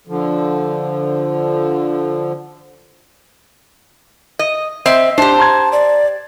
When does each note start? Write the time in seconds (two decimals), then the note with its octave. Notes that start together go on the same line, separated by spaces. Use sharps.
0.07 D3 F3
4.39 D#5
4.86 C4 D#5 E5
5.18 D4 G4 C5 A5
5.38 A#5 C6 G#6
5.72 D5